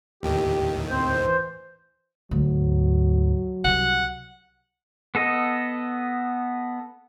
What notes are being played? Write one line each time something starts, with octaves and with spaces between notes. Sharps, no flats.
D#2 A2 D#3 G4
C4 C5
E3
D2 G#2 F#3
C2 F#5
B3 A4 D#5